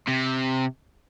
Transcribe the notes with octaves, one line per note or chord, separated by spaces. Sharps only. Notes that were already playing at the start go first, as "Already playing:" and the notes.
C3